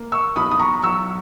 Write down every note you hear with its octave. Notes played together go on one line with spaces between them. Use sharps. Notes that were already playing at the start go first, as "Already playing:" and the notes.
Already playing: A#3
C#6 E6
B1 B5 D#6
D#6
A#5 C#6
F#3 C#6 E6